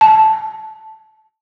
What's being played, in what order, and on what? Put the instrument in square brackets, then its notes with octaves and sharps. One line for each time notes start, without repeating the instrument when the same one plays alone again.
[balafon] A5